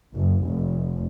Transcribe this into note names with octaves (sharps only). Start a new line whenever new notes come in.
F#1
F1